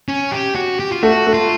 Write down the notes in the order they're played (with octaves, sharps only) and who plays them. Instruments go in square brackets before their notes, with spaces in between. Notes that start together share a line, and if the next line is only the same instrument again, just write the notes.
[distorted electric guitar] C#4
G4
F#4
G4
F4
[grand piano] A3 [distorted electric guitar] F#4
[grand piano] A3
[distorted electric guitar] F4